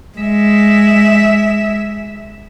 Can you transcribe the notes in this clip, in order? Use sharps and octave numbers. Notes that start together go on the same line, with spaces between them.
G#3 E5